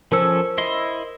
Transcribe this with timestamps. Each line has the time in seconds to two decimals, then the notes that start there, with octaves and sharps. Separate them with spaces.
0.12 F3 C#4 A4 A#4 C5 E6
0.58 E4 D#5 C6